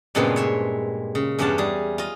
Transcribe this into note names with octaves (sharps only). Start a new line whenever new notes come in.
G2 A#2 C#3 G#3 B3 C4
C#5 E5 C6
C#3
E2 G2 C#4 G4 F#5 A5
G3 G#4
F4 D#5